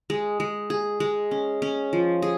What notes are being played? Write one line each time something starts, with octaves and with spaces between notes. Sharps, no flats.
G#3
G#3
G#4
G#3
C#4
C#4
F3
G#4